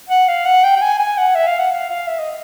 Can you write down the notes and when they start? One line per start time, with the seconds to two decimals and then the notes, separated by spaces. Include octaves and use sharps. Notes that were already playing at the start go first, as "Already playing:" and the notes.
0.09 F#5
0.28 F5
0.45 F#5
0.64 G5
0.76 G5
0.82 G#5
0.99 G#5
1.18 F#5
1.35 E5
1.47 F5
1.59 F#5
1.72 F5
1.90 F5
2.08 E5
2.19 D#5